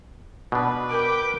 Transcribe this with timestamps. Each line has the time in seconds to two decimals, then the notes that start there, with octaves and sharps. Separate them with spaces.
0.52 B2 D4 B4
0.90 A#4 G5 D6